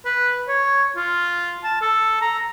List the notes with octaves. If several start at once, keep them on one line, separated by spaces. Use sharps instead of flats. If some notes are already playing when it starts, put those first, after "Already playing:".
B4
C#5
F4
A5
A4
A#5